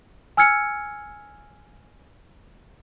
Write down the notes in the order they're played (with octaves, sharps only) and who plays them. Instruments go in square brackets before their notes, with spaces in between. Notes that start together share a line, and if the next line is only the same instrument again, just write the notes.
[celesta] G#5 E6 F6 G#6 C#7